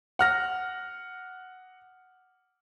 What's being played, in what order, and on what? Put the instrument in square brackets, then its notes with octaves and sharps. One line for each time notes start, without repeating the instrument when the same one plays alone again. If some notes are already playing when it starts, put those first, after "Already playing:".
[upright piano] F#5 F6 A#6